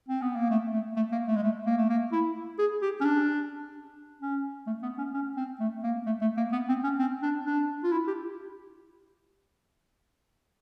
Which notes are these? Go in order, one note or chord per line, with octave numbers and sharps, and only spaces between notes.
C4
B3
A#3
A3
A3
A3
A#3
A3
G#3
A3
A#3
A3
A#3
E4
G#4
G4
C#4
D4
C#4
A3
B3
C#4
C#4
C4
A3
A#3
A3
A3
A#3
B3
C4
C#4
C4
D4
D4
F4
E4
G4